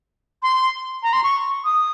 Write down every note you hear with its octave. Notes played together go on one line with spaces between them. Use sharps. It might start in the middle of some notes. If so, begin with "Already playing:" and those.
C6
A#5
C6
C#6
D#6